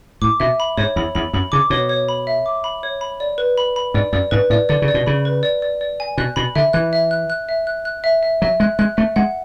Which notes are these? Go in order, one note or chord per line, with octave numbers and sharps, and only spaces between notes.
A2 D6
B2 E5
B5
G#2 C#5
E2 B5
E2 B5
F#2 B5
C#3 D6
B2 C#5
C#5
B5
E5
D6
B5
C#5
B5
D5
B4
B5
B5
G#2 D5
F#2 D5
G#2 B4
A2 D5
D3 D5
C#3
D5
B2
C#3 B5
B4
D5
D5
D5
G#5
B2 F#6
B2 B5
D3 E5
E3 F#6
E5
F#6
F#6
E5
F#6
F#6
E5
E5
F#3 E5
G#3 F#6
G#3 F#6
A3 E5
G#3 F#5